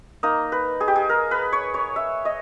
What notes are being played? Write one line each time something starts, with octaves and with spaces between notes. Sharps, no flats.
A#3 D#4 D#5
B4
G#4
G4
G#4
A#4
B4
C#5
C#5
E5
D#5